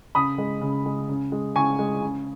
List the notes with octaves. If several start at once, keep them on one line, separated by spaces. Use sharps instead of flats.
C#3 B5 D#6
G#3
C#3
G#3
C#3
G#3
C#3 G#5 C#6
G#3
C#3